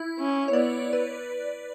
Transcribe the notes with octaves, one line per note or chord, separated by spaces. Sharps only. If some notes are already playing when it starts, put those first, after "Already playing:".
Already playing: E4
C#4
C#5
B3 D5
B4